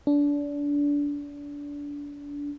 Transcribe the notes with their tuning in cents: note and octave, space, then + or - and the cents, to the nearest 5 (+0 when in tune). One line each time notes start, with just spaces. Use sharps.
D4 -25